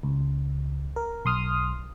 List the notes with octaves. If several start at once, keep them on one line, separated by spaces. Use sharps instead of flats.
C#2
A#4
B1 C6 D#6 F6